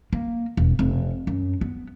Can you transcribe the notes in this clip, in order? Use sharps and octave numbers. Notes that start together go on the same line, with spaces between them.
A#3
E1
F1
F#2
B3